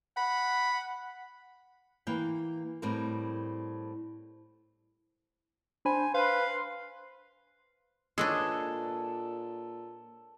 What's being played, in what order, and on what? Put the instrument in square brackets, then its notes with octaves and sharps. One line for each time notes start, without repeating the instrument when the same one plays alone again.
[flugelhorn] F#5 [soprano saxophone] B5
[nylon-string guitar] E3 A#3 G5
A2 G3 C4 A#4
[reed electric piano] D4 B5 [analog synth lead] C5 [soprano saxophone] G#5
[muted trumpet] B4 [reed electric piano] C5 [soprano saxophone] F5 [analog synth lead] C6
[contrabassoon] A#2 [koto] G#3 D4 [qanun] G#4 [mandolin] A4 B4 C#5